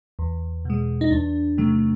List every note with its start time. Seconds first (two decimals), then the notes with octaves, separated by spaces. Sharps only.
0.19 E2
0.65 B2 G#3
1.01 D#4
1.11 E2 D4
1.58 C3 D#3 F#3 A3